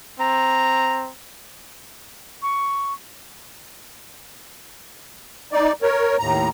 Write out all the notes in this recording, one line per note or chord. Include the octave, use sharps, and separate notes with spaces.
C4 A#5
C#6
D#4 D5
A#4 C#5
D#2 A2 A#5